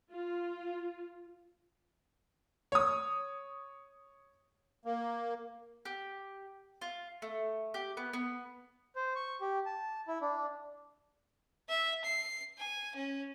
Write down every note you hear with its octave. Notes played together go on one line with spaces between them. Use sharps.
F4
C#5 D#6
A#3
G4
F4
A3
G4
B3
B3
C5
C#6
G4
A5
E4
D4
E5
C7
G#5
C#4